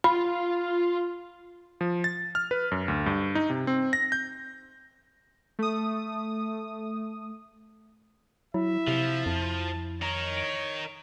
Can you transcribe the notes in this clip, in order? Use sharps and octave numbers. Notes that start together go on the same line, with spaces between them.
F4 B5
F3
A6
F6
B4
F#2
D2
G2
D#4
C3
C4
A#6
G6
A3 D#6
F#3 E4 E5
C3 F3
F2 A5
D#4 A#4 C#5
D7